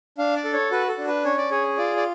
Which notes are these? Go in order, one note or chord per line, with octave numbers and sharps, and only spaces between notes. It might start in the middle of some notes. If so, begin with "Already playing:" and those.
D4 F5
D5
A4
C#5
F#4 B4
A4
D4
B4
C#4 C#5
D5
G#4 C#5
F4 D5
D5